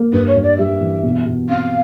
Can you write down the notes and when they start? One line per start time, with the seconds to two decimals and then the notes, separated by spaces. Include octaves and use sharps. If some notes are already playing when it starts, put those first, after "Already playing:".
Already playing: A#3
0.13 G2 B4
0.27 C#5
0.35 G2
0.43 D5
0.58 G3 E5
0.81 E3
1.03 B2
1.26 B2
1.49 C4 F5